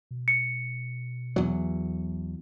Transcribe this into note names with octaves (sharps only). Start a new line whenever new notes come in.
B2
C#7
E2 F#3